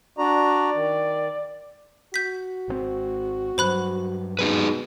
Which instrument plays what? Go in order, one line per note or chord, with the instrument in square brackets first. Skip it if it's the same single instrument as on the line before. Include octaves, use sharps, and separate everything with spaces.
[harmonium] D4 F#4 A#5 [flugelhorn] D5
[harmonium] D#3
[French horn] F#4 [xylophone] G6 B6
[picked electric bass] G#1 B2 C4
[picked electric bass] G2 F#3 [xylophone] C5 B5 F#6
[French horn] B2 [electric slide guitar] D#4 G#4 B4